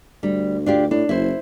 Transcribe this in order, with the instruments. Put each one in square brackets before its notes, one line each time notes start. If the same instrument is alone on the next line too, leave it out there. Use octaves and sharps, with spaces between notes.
[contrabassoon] D2 [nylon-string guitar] G3
[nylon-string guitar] D4 F4 G4
[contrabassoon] A2 [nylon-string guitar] D4
[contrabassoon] F#1 [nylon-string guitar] E4 C5